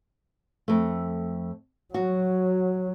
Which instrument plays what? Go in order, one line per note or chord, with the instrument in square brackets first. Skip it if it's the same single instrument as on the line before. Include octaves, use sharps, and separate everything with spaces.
[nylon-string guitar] F2 A3
[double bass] F#3 [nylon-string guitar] F#4